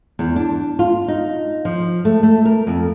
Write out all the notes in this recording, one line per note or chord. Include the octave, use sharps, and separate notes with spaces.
E2
D4
F4
D#4
F3
A3
A3
A#4
F2